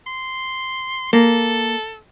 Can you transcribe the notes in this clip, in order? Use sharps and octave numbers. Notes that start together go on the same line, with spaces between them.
C6
A#3 A4